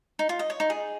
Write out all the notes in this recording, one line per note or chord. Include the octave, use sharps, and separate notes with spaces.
D#4
F4
D#5
C#5
D#4
G#4